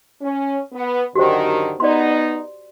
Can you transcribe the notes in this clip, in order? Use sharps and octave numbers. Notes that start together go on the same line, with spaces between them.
C#4
B3
F#2 D3 D#3 F#4 G4 C5
B3 D#4 D5 C6